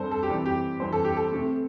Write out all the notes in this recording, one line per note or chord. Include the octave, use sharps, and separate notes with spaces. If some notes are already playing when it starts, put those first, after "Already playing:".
Already playing: G2 G3 C4 A4 C5
A4
G4
C3 E3 G3 C4
G4
G2 E3 C4 C5
A4
G4
A4
C3 A3 C4